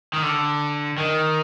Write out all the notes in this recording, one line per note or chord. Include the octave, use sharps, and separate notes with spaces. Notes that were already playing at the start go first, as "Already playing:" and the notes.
D#3
D3
D#3